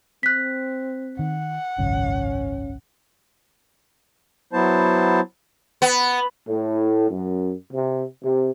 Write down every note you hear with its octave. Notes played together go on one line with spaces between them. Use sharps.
C4 F#6 B6
D#3 F#5
G#1 C#2 F#2 C#4
F#3 B3 E4 C5 A5
B3
A2
F#2
C3
C3